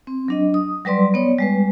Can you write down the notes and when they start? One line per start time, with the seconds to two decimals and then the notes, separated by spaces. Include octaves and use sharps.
0.07 C4
0.28 F#3 D4 D#5
0.54 D#6
0.85 F#3 G3 B4 D5 C6
1.14 B3 C#5 D5
1.38 G3 G#3 B4